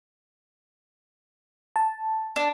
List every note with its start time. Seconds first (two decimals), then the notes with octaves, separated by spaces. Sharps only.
1.76 A5
2.36 D4